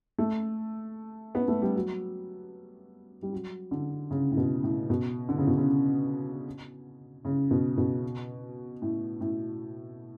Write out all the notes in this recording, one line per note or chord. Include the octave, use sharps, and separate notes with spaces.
A3
B3
A3
G3
F#3
G3
F#3
D3
C#3
A2
B2
A2
B2
D3
C#3
B2
C#3
C#3
B2
B2
A2
A2